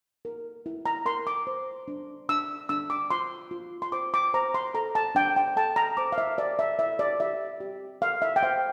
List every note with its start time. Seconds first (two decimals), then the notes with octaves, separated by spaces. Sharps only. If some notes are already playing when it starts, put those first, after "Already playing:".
0.25 A#4
0.66 E4
0.86 A#5
1.06 A#4 C6
1.27 D6
1.47 C5
1.88 D4
2.29 D4 E6
2.69 D4 E6
2.90 D6
3.10 F4 C6
3.51 F4
3.82 C6
3.92 C5 D6
4.14 D6
4.34 C5 A#5
4.54 C6
4.74 A4 A#5
4.95 A5
5.15 D4 G5
5.36 G5
5.57 A4 A5
5.76 A#5
5.97 C5 D6
6.12 F5
6.18 E5
6.38 A#4 D5
6.59 E5
6.79 E4 E5
6.99 D5
7.20 G4 E5
7.60 G4
8.01 A4 F5
8.22 E5
8.36 G5
8.43 C5 F5